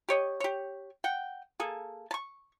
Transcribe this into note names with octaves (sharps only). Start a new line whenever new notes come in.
G4 C#5 D#5
G4 C#5
F#5 G5
A#3 G#4 A4
A5 C#6